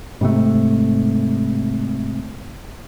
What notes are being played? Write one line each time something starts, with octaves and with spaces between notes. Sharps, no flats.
G#2 C3 A3